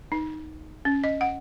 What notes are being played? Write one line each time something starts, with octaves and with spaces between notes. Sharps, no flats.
D#4
C#4
D#5
F#5